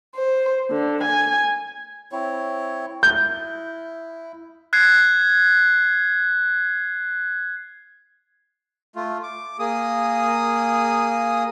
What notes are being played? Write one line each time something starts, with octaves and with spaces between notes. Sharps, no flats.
C5
D3
G#5
C4 E4 C#5
E4 G6
F#6 G#6 C7
A3 F4
D6
A#3 G#4 D#6